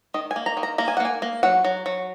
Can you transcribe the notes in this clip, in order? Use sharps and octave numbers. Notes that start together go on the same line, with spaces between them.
D#3 D#5
G#5
A#3
A#5
D#3
A#5
A#3 A#5
G#5
F#5
A#3 G#5
A#3
F#3 F#5
F#3
F#3